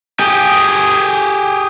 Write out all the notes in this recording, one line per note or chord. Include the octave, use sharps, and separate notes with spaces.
G4 G#4